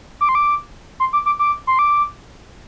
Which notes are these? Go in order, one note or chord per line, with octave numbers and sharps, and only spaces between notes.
D6
C6
D6
C6
D6
D6
D6
C6
D6